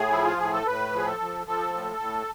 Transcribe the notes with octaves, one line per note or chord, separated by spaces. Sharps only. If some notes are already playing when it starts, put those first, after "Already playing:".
Already playing: A2 G#4
F3 E4
F4
A2 G#4
A4
A2 B4
F3 G#4
A4
F3
F3 A4
A2
A2